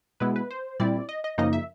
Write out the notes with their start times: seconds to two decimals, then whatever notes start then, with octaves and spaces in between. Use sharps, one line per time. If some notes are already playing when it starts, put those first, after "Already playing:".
0.20 B2 G#3 B3 E4 B4
0.36 B4
0.51 C5
0.80 A#2 G3 C4 E4 D5
1.09 D#5
1.24 D#5
1.38 F#2 C#3 F3 A#3 D#4 D#5
1.53 E5